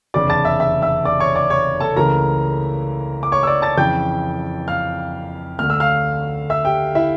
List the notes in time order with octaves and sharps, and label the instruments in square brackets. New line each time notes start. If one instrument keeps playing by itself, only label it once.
[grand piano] F1 E2 C#3 D5 D6
A5 A6
E5 E6
E5 E6
E5 E6
D5 D6
C#5 C#6
D5 D6
C#5 C#6
A4 A5
C#2 C#3 E3 A3 A#4 A#5
D6
C#5 C#6
E6
D5 D6
A5 A6
F2 C#3 E3 G5 G6
F5 F6
D2 D3 A3 F6
E6
F5 F6
E5 E6
G4 G5
E4 E5